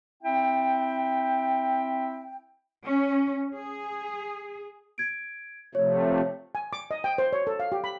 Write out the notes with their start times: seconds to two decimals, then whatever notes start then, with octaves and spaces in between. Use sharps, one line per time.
0.23 C4 E4 E5 G5
2.84 C#4
3.54 G#4
4.98 G#6 D7
5.75 C3 F3 A3 C#5
6.55 G#5
6.73 D6
6.91 D#5
7.04 G5
7.18 C5
7.33 C#5
7.47 A4
7.60 F5
7.72 G4
7.84 B5